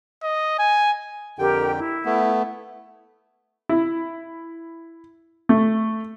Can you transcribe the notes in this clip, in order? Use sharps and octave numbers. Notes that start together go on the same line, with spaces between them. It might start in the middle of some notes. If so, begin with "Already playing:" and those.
D#5
G#5
F2 D3 G4 A#4 G5
E4
A3 B3
E4
A3